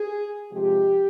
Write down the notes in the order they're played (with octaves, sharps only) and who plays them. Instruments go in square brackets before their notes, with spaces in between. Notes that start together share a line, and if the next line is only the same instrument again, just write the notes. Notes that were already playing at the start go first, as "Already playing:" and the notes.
Already playing: [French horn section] G#4
C3 F3 G#3 G4